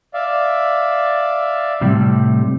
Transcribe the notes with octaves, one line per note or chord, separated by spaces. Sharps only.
D5 E5 F5
A2 C3 G3